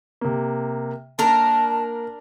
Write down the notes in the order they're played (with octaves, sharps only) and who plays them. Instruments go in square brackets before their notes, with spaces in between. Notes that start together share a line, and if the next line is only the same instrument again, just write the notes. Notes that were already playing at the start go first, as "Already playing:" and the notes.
[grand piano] C3 A#3
[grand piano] A#3 [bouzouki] D4 A#4 [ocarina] A5